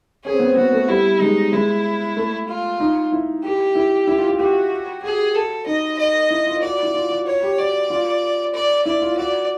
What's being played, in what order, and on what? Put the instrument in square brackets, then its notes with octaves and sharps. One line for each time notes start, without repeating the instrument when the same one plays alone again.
[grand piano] C#4 [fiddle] G#4
[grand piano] C4
B3
C4
[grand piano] B3 [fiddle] F#4
[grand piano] A3
[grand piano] G3 [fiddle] E4
[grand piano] G#3 [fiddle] D#4
[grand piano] G#3 [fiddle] E4
[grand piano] A3
[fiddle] F4
[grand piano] D#4
E4
[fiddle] G4
[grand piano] E4
E4
F4
F4
[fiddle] F#4 [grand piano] G4
[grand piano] F#4 [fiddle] G#4
[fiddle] A4
[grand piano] D#4 [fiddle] D#5
[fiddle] D#5
[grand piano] E4
F4
[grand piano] F#4 [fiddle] D5
[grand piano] E4
F4
F#4
[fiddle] C#5
[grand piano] G4
[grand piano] F#4 [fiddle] D5
[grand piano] F4
[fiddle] D5
[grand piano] E4 [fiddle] D5
[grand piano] F4
[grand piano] F#4 [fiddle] D5